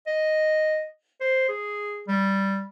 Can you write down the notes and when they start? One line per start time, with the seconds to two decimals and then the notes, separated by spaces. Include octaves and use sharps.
0.07 D#5
1.21 C5
1.48 G#4
2.08 G3